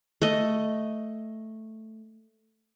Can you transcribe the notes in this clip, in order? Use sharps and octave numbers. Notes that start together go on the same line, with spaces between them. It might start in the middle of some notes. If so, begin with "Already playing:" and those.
A3 D#5